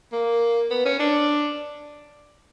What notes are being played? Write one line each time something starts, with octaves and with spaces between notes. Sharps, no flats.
A#3
B3
C#4
D4